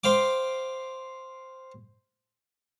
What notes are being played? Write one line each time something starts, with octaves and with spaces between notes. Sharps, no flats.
C5 F5 G5 D6